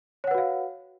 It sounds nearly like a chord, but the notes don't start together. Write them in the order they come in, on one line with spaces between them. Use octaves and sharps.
C#5 F#5 B4 F#4 F5